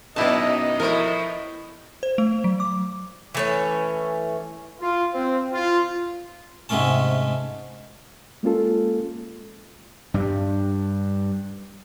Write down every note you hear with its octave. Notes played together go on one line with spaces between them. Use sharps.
F#2 B2 B3 D#4 E4 D5 D#5 A5
A2 F3 E4 A#4
C5
A3
F#3
D6
E3 A3 C#4
F4
C4
F4
G#2 C3 G#3 A3 C#4 A5
G#3 A#3 C#4 F4 A4
G2 G3